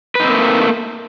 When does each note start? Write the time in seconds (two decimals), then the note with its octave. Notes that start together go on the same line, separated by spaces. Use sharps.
0.15 B4
0.20 D#4
0.24 C4
0.29 A#3
0.33 A3